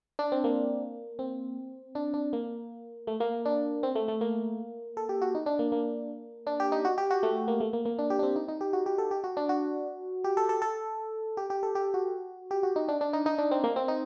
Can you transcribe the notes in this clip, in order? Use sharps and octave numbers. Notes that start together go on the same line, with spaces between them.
D4
C4
A#3
C4
D4
D4
A#3
A3
A#3
D4
C4
A3
A3
A#3
A4
G4
F#4
D#4
D4
A#3
A#3
D4
G4
D#4
F#4
G4
F#4
A3
A#3
A3
A#3
A#3
D4
G4
D4
C4
D#4
D#4
G4
F#4
G4
A4
G4
F#4
D4
F#4
G4
A4
A4
A4
G4
G4
A4
G4
F#4
G4
F#4
D#4
D4
D4
D#4
D#4
D4
C4
A#3
C4
D#4